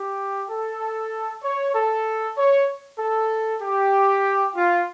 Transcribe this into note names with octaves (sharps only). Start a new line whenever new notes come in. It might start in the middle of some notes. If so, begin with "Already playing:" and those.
Already playing: G4
A4
C#5
A4
C#5
A4
G4
F4